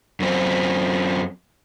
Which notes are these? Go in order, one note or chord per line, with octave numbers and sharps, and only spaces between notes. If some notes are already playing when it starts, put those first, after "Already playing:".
F#2 C4